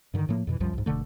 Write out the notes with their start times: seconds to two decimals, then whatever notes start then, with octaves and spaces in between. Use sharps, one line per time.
0.14 G2 D3 D#3
0.29 A2 F3 A#3
0.47 F2 B2 E3
0.60 C2 F#2 F3 G3
0.73 C2 G#2
0.86 F1 B2 D3 A3